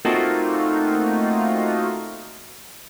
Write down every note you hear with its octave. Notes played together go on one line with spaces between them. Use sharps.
A3 A#3 C4 D#4 F4 F#4